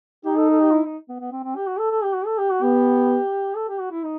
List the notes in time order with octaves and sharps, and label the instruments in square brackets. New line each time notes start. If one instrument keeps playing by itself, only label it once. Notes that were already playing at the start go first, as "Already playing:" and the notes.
[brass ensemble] D#4 [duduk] G4
[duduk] A4
A4
G4
E4
D#4
B3
B3
C4
C4
G4
F#4
A4
A4
G4
F#4
A4
G4
F#4
[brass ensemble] B3 [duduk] G4
[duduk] A4
G4
F#4
E4
D#4